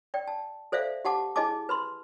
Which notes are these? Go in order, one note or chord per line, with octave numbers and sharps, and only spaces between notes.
D5 G5
A5
A4 C5 D5 E5 F5
G4 F#5 A5 D6
E4 G#4 D#5 G#5 A5 D6
B4 B5 C6